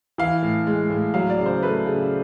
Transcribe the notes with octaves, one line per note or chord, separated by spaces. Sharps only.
E3 F5
A2
G#3
A2
F#3 F5
D5
C#3
C5
A3 B4
C#3